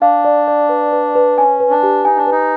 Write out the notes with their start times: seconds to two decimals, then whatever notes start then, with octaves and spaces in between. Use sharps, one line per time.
0.02 D4 F5
0.25 D5
0.48 D5
0.69 B4
0.92 B4
1.15 B4
1.38 C#4 G#5
1.60 B4
1.71 D4
1.83 G4
2.05 D#4 G#5
2.17 D4
2.27 D#4 B4